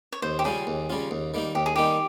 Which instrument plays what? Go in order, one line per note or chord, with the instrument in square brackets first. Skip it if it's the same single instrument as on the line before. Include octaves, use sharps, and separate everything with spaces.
[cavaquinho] C#5
[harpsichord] D#2 [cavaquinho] C5
[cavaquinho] G4
[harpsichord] C#3 G3 C#4 F4 [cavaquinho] G#4
[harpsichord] D#2
C#3 G3 C#4 F4
D#2
D#3 G3 A#3 D#4
[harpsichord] D#2 [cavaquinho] G4
[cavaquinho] G#4
[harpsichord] D#3 G3 A#3 D#4 [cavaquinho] G4